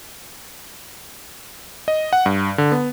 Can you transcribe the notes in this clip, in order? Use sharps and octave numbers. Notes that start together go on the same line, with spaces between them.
D#5
F#5
G2
D3
B3